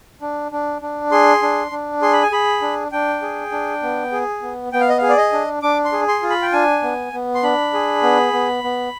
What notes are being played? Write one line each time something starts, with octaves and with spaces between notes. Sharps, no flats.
D4
D4
D4
G#4 C6
D4
D4
G#4 C6
B5
G#5
G#4 B5
D4
D4 G5
G#4
D4
B3
G#4
B3
B3 G5
F5
D#5
G#4 F5
D5
D#5
D4
D4 D6
C6
G#4
C6
F4
B5
G5
D4 G#5
B3
B3
C6
D4 B5
G#4
B3
B3
B3